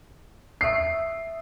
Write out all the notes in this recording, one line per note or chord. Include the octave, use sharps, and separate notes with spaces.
E5 D#6 E6 C7